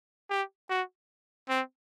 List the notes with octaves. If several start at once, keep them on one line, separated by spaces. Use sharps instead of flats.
G4
F#4
C4